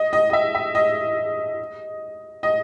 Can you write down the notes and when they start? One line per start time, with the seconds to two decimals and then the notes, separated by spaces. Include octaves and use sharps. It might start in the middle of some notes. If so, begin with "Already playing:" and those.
Already playing: D#5
0.13 D#5
0.30 D#5
0.33 E5
0.55 E5
0.75 D#5
2.43 D#5